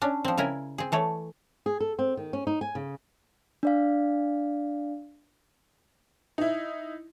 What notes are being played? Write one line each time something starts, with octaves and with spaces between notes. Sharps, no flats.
C#4 D4
F3 C4
C#3 E4 A#4 G#5
C4 G#4
E3 A3 C#5
G#4
A4
C4
D#3
C#4
D#4
G#5
C#3
D4 D5 F5
D#4 E4